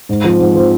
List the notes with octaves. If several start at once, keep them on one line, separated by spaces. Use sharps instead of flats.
G#2
F3 C4
G#2
F3 C4